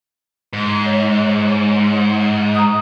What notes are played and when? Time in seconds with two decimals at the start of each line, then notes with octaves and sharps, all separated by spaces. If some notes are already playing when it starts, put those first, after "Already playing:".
0.53 G#2
0.86 C#5
2.55 A#5 D#6